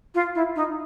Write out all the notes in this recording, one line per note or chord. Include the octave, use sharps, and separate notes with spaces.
F4
E4
D#4